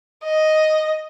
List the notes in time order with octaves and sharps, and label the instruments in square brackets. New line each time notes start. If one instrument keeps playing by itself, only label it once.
[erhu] D#5